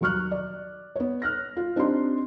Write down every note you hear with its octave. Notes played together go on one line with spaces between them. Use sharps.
D#2 F#3 C#6 F6 F#6
D5
B3 C#5
F6 F#6 A#6
F4
C4 D4 D#4 G4 D#5 C6